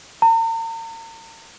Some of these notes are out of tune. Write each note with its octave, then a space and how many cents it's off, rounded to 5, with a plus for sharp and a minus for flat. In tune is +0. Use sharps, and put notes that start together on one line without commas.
A#5 -45